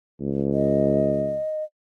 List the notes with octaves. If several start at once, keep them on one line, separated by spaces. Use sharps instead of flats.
C#2
D#5